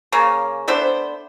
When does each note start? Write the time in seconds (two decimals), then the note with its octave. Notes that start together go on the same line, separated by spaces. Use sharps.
0.12 C#3 A#3 C#4
0.68 A3 B3 D4 C5